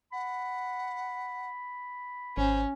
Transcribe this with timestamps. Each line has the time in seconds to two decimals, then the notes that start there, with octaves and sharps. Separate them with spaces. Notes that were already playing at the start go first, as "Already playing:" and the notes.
0.12 F#5 B5
2.37 G#1 C#4 C5